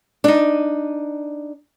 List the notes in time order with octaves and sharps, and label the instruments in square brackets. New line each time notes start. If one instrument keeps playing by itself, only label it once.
[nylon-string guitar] D4 D#4